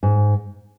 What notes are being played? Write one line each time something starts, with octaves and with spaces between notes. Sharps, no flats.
G#2